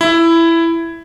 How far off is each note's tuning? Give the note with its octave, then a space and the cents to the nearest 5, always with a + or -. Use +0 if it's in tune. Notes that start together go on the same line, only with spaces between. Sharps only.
E4 +10